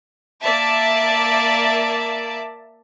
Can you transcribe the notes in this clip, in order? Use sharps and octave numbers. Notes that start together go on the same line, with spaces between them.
A#3 D5 E5 A5